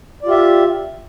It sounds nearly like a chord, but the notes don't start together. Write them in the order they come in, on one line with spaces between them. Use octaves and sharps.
D5 F4 G4 E5